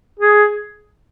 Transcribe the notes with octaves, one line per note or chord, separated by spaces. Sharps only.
G#4